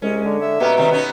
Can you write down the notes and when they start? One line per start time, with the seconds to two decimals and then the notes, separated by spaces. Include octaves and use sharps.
0.02 C2 G#3 C#4
0.25 D3
0.41 E5
0.60 B2 A#3 B3 G4
0.77 C3 D#3 G3
0.91 B3 C#4 D#4